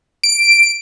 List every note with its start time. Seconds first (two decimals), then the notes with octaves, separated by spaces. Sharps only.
0.23 D7